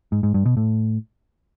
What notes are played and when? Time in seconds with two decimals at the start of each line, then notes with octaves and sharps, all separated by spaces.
0.12 G#2
0.23 G#2
0.34 G2
0.46 B2
0.57 A2